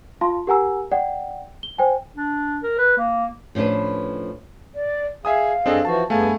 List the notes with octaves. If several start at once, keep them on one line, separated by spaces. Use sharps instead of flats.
F4 F5 A5 C6
G4 A#4 F#5 G#5 A#5 E6
D5 F#5 G5
G7
C5 G5 G#5
D4
A#4
B4
A#3
A2 F3 C#4 D4 B4
D5
G#4 E5 F5 G#5 D#6
G2 C4 D4 G#4 A4 D#5
E3 F3 F#4 A5
G2 A3 B3 G#4 F5 G#5 A5